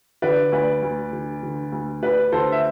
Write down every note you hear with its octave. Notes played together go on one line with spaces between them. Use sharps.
D3 B4 D5
D2 B4 D5
D2
D3
D3
D2
D2 B4 D5
D3 A4 C5
E5